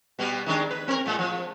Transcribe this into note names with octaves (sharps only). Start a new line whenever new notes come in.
B2 G3 B3
D#3 G#3 D4
B4
C4 A#4
A2 G#3
F3